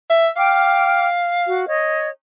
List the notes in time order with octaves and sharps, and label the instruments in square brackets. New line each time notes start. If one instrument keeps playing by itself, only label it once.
[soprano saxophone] E5
[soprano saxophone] F5 [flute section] G5 D6 F6
[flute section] F#4
C#5 D#5